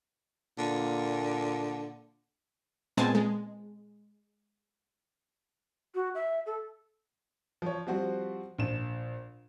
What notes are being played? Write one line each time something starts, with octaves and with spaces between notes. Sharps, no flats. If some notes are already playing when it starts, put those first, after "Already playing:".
A#2 D3
A#2 G#3 B3 C4 G#5 A5
G#3
F#4
E5
A4
F3 C#5
F3 G3 C4 F#4 C5
A#1 E7